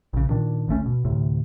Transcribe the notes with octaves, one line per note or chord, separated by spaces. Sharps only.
A#1 C#3
A#2 D#3 D4
G#1 D2 A3 C#4
B2
D2 A2 C3